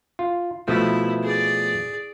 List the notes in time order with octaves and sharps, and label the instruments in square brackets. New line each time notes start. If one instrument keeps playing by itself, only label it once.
[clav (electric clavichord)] F4
[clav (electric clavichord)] B2 F3 A3 [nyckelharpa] E4
[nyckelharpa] G#4 D5